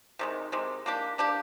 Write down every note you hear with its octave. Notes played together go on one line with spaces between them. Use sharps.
C3 D#3 G#3
C3 D#3 G#3
A#3 D4 G4
A#3 D4 G4